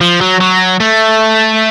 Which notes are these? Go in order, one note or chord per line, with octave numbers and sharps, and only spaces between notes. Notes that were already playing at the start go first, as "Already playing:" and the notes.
F3
F#3
F#3
A3